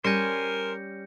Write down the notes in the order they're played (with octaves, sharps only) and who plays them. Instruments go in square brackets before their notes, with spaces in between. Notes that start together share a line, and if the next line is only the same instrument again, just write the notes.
[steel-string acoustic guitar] G3 C#4 [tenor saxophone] A#4 [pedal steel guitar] C5 G#5 [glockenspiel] G6 A#6 C#7